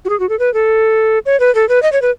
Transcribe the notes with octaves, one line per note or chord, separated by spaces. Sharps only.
F#4
G#4
F#4
A4
B4
A4
C#5
B4
A4
B4
D#5
C#5
B4